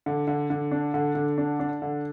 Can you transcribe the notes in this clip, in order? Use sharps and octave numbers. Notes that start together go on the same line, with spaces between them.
D3
D3
D3
D4
D3
D3
D4
D4
D3